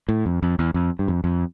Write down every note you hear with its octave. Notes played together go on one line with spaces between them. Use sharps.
A2
F2
F2
E2
F2
G2
F2
F2